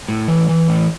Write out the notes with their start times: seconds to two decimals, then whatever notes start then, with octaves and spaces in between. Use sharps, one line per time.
0.08 A2
0.28 E3
0.49 E3
0.68 A2